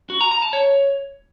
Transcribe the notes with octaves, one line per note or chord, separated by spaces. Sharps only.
F#4
A#5
A#5
A5
C#5